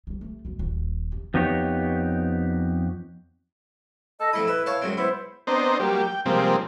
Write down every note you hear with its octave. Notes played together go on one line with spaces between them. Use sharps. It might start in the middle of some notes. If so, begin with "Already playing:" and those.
G3 G#3
C3 A3
D#2 B2
D#1
C3
F2 B3 D#4 G4 C#5
A4 D#5
F2 A3 E4 B5 D#6
B4 E5
C#5 F5 A5
C#2 F#2 C4
B3 E4 C5
B3 C4 D4 C5 D#5 A#5
F#3 G3 A#3 G4
G5
C3 F3 G3 G#3 A#3 C4